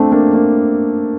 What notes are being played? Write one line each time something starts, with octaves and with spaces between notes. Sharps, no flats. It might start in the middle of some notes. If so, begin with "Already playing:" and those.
Already playing: A3 C4 D4
A#3 D4
A#3 D4